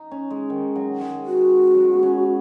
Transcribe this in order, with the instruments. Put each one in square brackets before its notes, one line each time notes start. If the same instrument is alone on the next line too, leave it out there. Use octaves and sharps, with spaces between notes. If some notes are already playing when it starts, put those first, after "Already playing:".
Already playing: [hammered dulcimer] D#4
C#4
G#3
D#3
F#3
G#3
[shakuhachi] F#4
[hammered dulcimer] F#3
G#3
B3
C#4